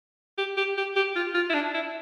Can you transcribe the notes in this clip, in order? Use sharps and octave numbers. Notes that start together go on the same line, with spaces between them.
G4
G4
G4
G4
F4
F4
E4
D4
E4